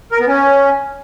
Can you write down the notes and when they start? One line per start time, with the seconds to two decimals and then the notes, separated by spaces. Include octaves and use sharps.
0.12 A#4
0.20 B3
0.28 C#4